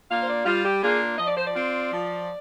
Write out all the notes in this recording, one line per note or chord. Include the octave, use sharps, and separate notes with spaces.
A#3 D4 F4 F5
C5
D5
G3 F4
G4
A#3 D4 F4 G#4
F3 D#5
D5
C5
D5
C4 F4
F3